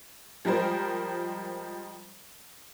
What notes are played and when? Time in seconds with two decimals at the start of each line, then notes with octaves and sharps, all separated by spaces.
0.45 F3 G3 G#3 A#4 C5